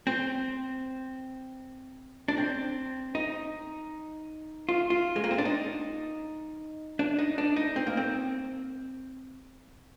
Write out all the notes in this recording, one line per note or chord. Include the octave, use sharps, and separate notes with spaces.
C4
D4
C4
D#4
F4
F4
G#3
A#3
C4
D4
D#4
D4
D#4
D4
D#4
C4
A#3
C4